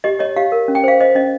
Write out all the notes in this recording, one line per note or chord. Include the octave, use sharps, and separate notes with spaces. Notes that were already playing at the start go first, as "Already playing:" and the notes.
G4 D#5
C#5 D#5
G4 F5
A#4
C#4
G5
C5 F5
C5 D#5
C#4 D#5